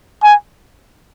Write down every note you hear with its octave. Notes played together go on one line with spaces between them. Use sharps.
G#5